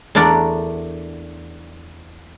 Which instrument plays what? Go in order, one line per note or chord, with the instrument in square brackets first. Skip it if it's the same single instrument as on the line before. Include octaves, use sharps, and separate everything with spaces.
[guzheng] E2 A3 D4 A#4 D5 F#5